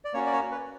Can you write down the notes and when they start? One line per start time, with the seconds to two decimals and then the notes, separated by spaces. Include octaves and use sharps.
0.05 D5
0.14 A#3 C#4 F#4 C#5
0.26 D5
0.33 C#5
0.52 B4